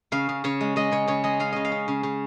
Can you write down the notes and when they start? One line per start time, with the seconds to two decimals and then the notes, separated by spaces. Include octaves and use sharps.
0.12 C#3 F5
0.29 C#3
0.44 C#3 C#5
0.61 G#3
0.76 G#3 D#5
0.92 C#3 C#5
1.08 C#3 C#5
1.24 G#3 D#5
1.40 C#4 F5
1.52 C#3 D#5
1.65 F5
1.72 C#4
1.88 C#3
2.03 C#3